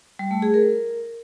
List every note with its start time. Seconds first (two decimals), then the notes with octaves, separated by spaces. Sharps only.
0.19 G3
0.31 A3
0.42 G#4
0.54 A#4